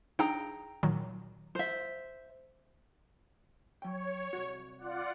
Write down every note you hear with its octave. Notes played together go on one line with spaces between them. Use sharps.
D4 D#4 G#4 G5 A#5
A#2 D#3 F#3
C5 E5
F#3 C#5 G5
C2 F#4
F4 D5 F#5